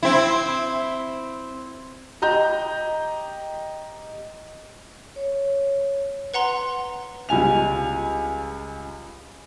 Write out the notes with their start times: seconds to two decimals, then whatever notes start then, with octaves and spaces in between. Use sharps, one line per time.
0.03 C4 E4
2.22 G4 D#5 A#5 G6
5.16 C#5
6.34 B4 F#5 A#5 C6
7.29 C#2 G3 G#5 F7